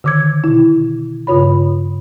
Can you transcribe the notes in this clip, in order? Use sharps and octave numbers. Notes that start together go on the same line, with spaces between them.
D3 D#3 D6 E6 G#6
B2 E4
G2 C#3 F4 C#5 B5